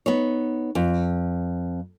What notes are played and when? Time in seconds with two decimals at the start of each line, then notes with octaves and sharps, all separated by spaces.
0.06 B3 D#4 C#5
0.75 F2